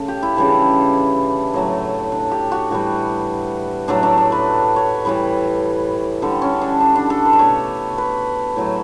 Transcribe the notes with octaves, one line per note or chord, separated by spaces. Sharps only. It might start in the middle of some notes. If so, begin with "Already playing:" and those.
Already playing: C#3 A3
G4
E4
C#3 E3 G3 D4
A2 F#3 A3
D4
G4
F#4
A2 E3 G3 F#4
A2 F#3 A3 D4
D4
D4
B4
C#5
A2 E3 G3 B4
D3 G3 A4
C#4
D4
D4
D4
A4
B4
D5
B2 A3 C#5
B4
A2 F#3 A3